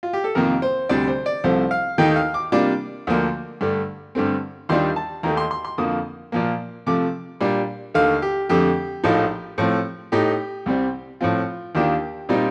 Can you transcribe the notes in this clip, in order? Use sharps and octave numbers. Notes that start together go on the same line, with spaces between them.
F4
G4
A4
F2 C3 D#3 A#3 F4 A#4
C5
D2 C3 G3 D4 D5
C5
D5
C2 C3 F3 A3 C5
F5
D#2 D#3 A3 D#4 G5
F5
D6
C3 G3 A#3 D4 F4 D6
D2 D3 F3 A#3
G2 D3 A3
G2 D3 A3 C4
D#2 D#3 G3 D4 F4 C6
A5
D#2 D#3 A3 A#5
C6
C6
C6
F2 D3 F3 A#3 D#6
A#2 F3 A#3
C3 F3 A3 D6
A#2 G3 D4
D#2 D3 A3 F5
G4
F2 D3 A3 G4
A#1 A2 F3 A3 D#4
A2 F3 A3 C4
A2 A3 D#4 G4
C2 C3 G3 C4
A2 F3 C4 F4
D#2 D#3 A#3 D4 F4 G4
A#2 G3 C4 D#4